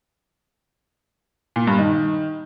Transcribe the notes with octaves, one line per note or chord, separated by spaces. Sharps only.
A#2
G2
D#3